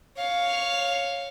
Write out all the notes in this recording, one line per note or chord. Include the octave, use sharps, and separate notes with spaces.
C#5 F5